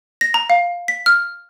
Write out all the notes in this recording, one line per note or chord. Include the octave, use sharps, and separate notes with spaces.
A#6
A#5
F5
B6
F6